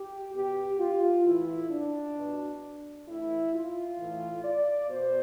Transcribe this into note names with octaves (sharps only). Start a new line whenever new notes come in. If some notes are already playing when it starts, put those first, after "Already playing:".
Already playing: G4
B2 G4
F4
A2 E3 E4
D4
B2
A2 E3 E4
F4
A2 E3
D5
B2 C5